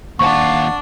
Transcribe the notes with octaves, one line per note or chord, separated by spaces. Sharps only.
D#2 D4 F4 F#5 C#6